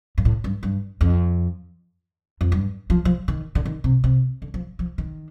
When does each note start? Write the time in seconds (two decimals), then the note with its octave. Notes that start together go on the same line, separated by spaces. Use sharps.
0.18 G2
0.25 A2
0.44 G2
0.63 G2
1.01 F2
2.41 F2
2.52 G2
2.90 F3
3.05 F3
3.28 D#3
3.55 D3
3.65 D#3
3.84 C3
4.04 C3
4.42 D3
4.54 F3
4.79 F3
4.98 D#3